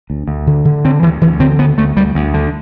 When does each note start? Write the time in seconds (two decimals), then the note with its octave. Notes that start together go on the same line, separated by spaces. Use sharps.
0.10 D2
0.28 D2
0.47 D3
0.65 D3
0.85 D3 C4
1.03 D2 E3
1.22 D2 E3
1.40 D3 C4
1.59 D2 B3
1.78 D2 A3
1.97 D2 G3
2.15 D2
2.34 D3